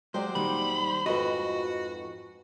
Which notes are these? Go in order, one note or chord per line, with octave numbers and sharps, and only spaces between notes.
F#3 G#3 G4 C5 D5
A#2 D#3 G3 B5
F2 G#2 F#4 B4 D#5